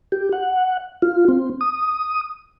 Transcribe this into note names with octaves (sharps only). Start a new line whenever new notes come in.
G4
F#5
F4
C4
D#6